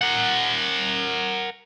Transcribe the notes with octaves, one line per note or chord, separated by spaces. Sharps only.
A#4 F#5